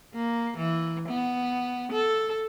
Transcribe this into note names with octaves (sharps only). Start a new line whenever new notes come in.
A#3
E3
B3
A4